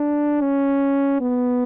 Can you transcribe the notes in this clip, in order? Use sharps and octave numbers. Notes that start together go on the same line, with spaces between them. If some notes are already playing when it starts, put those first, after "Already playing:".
Already playing: D4
C#4
B3